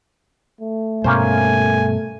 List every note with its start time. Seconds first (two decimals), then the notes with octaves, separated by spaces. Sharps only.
0.61 A3
1.04 G2 B2 G3 A#3 C#4 C5 G#5